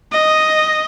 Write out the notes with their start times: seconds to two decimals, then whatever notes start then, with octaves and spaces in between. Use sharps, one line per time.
0.12 D#5